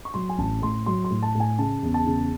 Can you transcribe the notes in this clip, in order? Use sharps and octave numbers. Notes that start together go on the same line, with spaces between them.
C#6
F#3 C6
G#5
A1 A5
A2 C6
F#3 C6
C6
A2
A5
A2 G#5
C#3 A5
E2
A5
C#3